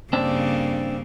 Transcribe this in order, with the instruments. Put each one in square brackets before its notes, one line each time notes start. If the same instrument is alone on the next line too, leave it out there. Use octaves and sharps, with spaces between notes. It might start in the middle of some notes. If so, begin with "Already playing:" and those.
[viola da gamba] G2 C#3 A#3 [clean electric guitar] C4 D4